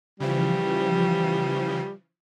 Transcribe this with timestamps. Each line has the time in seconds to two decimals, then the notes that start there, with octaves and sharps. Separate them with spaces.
0.20 C#3 E3 F3 G3